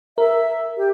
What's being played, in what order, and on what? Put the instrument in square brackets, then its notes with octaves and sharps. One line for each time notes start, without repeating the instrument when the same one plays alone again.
[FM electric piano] A#4 [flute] E5
[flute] G4